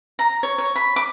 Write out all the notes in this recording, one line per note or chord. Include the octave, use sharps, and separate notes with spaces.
A#5
C#5
C#5
B5
D6